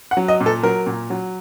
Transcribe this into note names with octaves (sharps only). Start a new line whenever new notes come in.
F#5
F#3
D#5
A#2
A4
F#3 A#4
A#2
F#3